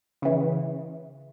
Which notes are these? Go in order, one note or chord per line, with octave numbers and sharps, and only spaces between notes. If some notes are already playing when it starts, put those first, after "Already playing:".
C#3 E3